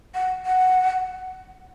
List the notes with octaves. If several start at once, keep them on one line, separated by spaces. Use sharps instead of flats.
F#5
F#5